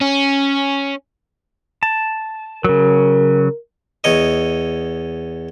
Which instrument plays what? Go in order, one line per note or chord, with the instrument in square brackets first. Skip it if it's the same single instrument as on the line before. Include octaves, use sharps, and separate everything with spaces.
[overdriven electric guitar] C#4
[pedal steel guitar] A5
[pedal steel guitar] C#3 F#3 [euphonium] A#4
[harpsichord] E2 C#5 D#5